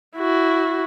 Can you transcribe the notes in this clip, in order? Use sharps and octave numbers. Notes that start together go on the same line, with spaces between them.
E4 F#4